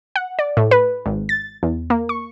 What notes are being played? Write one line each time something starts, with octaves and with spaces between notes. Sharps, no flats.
F#5
D5
A2
B4
G#1
A6
E2
A#3
C#6